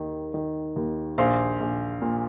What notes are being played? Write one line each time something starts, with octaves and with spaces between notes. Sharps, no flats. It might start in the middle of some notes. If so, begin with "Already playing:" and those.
Already playing: D#2 D#3
D#3
D#2
A#1 C5 F5
A#1
A#2